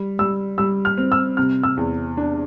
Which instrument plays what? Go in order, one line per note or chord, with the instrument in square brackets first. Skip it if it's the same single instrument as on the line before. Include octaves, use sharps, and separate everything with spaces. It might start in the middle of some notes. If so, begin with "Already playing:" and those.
Already playing: [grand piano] G3
[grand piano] G3 [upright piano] E6
[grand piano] G3 [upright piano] E6
[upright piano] F6
[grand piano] C4
[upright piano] E6
[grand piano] C3 [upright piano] F6
[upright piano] E6
[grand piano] E2
D4